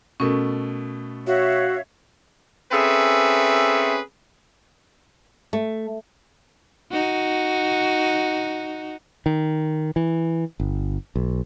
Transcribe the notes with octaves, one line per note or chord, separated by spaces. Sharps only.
B2 A3 C#4 A#4
F#4 C#5 E5 F5
C4 C#4 G#4 A4 B4 E5
A3
D#4 F#4
D#3
E3
G1
B1